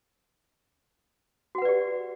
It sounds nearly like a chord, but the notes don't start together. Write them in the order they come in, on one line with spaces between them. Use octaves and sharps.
F#4 F#5 B4 D5 G4